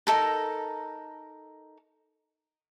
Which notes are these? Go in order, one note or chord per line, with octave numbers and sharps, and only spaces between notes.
D#4 A4 A#4